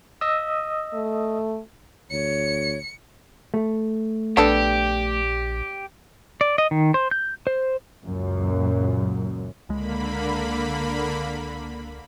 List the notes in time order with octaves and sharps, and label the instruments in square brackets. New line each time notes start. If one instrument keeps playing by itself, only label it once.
[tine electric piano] D#5 D#6 E6
[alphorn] A3
[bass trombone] D2 [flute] C#5 [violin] C#7
[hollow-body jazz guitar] A3
[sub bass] A#1 [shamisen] B3 D4 A4 [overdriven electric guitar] G4
[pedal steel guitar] D5
D#5
D#3
C5
G6
C5
[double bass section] C#2 F#2 A#2
[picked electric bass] C#2 G#3 [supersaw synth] D3 A#3 B5